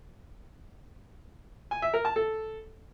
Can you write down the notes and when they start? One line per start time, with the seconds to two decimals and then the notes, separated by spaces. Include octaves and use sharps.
1.71 G#5
1.82 E5
1.94 A#4
2.05 A5
2.16 A4